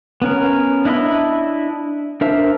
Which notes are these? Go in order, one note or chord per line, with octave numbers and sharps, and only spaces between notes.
B3 C#4 A#4
D4 E4 D#5 E5 B5
D4 A#4 C5 E5